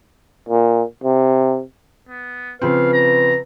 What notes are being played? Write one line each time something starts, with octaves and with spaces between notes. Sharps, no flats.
A#2
C3
B3
C#3 F3 C4 B4 F5
A#5